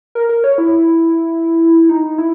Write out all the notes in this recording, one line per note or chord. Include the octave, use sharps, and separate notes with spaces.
A#4
A#4
C#5
E4
D#4
E4